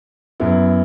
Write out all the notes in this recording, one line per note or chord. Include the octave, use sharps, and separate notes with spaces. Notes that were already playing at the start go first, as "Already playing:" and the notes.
F#2 F#3 B3 E4